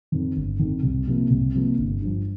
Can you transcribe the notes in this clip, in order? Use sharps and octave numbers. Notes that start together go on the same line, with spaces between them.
F2 D#3
G1
F2 D#3
C2
C3 F3 A#3
C2
C3 F3 A#3
G1
G2 F3